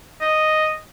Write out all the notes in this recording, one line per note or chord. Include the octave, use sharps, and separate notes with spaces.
D#5